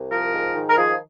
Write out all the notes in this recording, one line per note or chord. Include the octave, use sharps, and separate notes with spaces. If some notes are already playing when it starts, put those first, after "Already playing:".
Already playing: C2
F3 A#4
G#2
D#3
A#4
F3 G#4